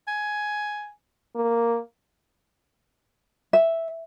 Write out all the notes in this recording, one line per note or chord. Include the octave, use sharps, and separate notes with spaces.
G#5
A#3
E5